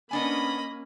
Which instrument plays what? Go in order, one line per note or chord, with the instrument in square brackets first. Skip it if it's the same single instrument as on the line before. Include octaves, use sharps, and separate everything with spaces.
[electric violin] A#3 C#4 [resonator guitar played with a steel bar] B3 D4 G#5 [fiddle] D#5 B5